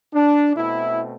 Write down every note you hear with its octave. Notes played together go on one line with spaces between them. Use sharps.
D4
B2 A3 C4 E4